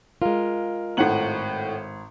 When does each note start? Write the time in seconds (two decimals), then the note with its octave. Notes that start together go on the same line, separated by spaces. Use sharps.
0.22 G#3 F4 A#4 F5
0.97 G#1 A2 F#5 F#7